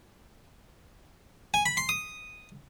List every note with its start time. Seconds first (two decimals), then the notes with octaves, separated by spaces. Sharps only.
1.54 G#5
1.66 B5
1.77 C6
1.89 D#6